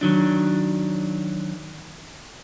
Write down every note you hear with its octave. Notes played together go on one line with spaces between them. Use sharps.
D#3 F#3 D4